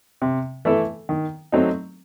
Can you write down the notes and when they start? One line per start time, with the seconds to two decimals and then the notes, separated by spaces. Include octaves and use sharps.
0.22 C3
0.65 E3 A3 E4 A4
1.09 D#3
1.52 F#3 A3 C4 D#4